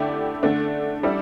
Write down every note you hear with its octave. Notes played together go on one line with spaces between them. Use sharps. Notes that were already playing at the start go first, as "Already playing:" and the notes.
Already playing: D3 A3 E4 G4 D5
D3 A3 D4
G3 E4 A4 D5